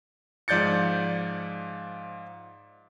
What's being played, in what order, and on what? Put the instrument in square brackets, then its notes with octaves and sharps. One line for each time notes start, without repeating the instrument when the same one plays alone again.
[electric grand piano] G#2 F3 D5 G6 A6 C#7